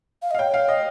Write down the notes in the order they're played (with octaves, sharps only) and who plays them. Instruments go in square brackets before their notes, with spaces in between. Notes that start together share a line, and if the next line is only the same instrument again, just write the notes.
[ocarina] F5
D#5
[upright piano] F5
[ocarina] C#5 [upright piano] G5
[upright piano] F5
D#5